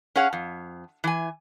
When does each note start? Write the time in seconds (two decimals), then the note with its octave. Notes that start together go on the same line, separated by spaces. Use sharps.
0.16 C#4 G#4 C#5 F5 F#5
0.33 F2
1.04 E3 G#5